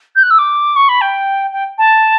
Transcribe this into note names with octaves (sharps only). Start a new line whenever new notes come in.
G6
F#6
E6
D6
C#6
B5
G5
G5
A5